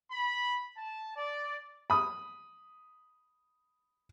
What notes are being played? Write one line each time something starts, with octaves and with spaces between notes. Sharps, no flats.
B5
A5
D5
B5 D#6